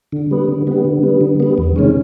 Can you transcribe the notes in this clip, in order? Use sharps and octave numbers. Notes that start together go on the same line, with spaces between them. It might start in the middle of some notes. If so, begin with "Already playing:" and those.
D3
G3 B3
D3
G3 B3
D3
G3 B3
D3
G3 B3
E2
C3 D#3 G#3 C#4